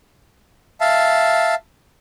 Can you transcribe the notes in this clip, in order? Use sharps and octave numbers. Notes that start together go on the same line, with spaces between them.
E5 F5 A5